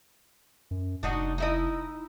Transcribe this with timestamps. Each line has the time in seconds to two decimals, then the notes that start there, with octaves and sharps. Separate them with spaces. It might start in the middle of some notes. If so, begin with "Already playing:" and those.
0.71 F#2
1.03 F1 D4 D#4 F#4
1.38 D#4 E4 D#5